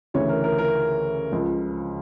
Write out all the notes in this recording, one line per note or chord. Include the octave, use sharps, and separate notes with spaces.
D2 C#3 E3 C#5
A#4
A#4
A#4
C#2 C#3 F3